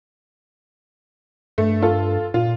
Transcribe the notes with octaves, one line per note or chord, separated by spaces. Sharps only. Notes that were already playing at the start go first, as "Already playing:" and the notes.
G2 A3
F4 A4
A#2 F4